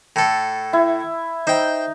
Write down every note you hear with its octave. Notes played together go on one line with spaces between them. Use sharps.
A2 A4
E4
D#4 C5 G5